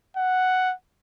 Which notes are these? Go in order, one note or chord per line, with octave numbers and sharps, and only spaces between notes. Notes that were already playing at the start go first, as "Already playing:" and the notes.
F#5